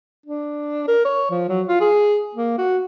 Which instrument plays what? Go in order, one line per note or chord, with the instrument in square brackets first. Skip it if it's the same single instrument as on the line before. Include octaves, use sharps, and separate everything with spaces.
[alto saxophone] D4
A#4
C#5
F3
F#3
F4
G#4
A#3
F#4